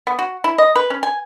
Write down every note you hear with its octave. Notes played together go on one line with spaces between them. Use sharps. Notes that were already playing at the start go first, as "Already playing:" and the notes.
B3
F#4
E4
D#5
B4
C#4
G#5